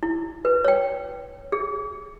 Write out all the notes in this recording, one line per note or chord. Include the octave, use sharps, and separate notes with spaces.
E4
B4
C#5 G5
G#4